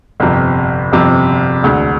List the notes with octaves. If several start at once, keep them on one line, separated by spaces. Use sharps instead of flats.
G1 F2 C3
G1 F2 C3
E1 D2 D3